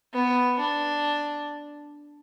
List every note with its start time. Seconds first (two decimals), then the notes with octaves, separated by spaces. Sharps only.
0.13 B3
0.59 D4